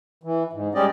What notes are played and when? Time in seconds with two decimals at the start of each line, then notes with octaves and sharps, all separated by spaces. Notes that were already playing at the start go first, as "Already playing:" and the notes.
0.23 E3
0.53 G#2
0.75 G3 G#3 C#4 G4 D5 D#5